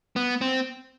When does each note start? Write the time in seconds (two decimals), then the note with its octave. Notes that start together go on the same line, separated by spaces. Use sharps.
0.16 B3
0.41 C4